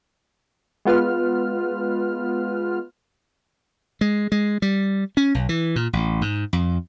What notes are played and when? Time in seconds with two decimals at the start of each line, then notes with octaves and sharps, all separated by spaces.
0.85 G#3 B3 F4 B4 F6
4.01 G#3
4.32 G#3
4.62 G3
5.17 C#4
5.35 B1
5.49 E3
5.76 A#2
5.93 A1
6.22 G#2
6.53 F2